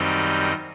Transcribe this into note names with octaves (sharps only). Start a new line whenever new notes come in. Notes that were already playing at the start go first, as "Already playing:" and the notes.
Already playing: F#2 D#3 G3 C4 D#4